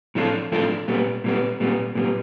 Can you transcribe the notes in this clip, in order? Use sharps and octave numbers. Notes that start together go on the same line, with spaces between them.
A2 F3 A3 D4 F4
A2 F3 A3 D4 F4
A#2 G3 B3
A#2 G3 B3
A#2 G3 B3
A#2 G3 B3